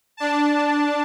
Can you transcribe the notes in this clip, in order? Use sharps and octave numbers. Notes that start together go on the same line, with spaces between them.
D4 A5